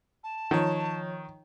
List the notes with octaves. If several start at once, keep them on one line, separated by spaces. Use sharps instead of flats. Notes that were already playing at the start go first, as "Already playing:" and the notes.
A5
D#3 F3 C#5